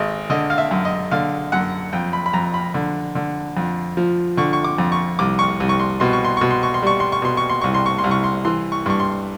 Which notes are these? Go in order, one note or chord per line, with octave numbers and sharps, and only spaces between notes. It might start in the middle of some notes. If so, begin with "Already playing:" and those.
Already playing: G#1 D#5
D3 D#5
F5
E5
F#2
D#5
D3 F5
F#2 F#5
F2 G5
B5
B5
F2 A#5
B5
D3
D3
F2
F3
D3 C#6
C#6
D6
F2
C#6
C2 D6
C#6
C2
C#6
C6
B2 C6
C#6
C6
B2 C#6
C6
C#6
C6
G3 C#6
C6
C#6
B2 C6
C#6
C6
C2 C#6
C6
C#6
C6
C2
C#6
C6
E3 C6
C#6
G2 C#6
C6